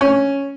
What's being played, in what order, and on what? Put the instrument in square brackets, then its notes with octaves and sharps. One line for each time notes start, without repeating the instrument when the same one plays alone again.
[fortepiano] C#4